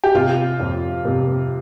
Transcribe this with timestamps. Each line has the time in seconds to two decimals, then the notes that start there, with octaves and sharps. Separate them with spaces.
0.04 G4
0.14 C3 F4
0.60 F2
1.05 C3